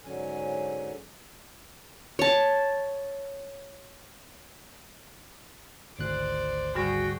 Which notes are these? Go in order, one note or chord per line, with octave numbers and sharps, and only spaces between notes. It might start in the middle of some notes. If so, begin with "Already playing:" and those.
G#2 D3 F#3 C#4 G#5
C#5 A5
G#1 D2 C5 D5 F#6
G#2 D3 G3 F#4 G#4 G5